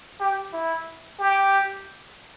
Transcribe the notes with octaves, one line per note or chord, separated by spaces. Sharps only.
G4
E4
G4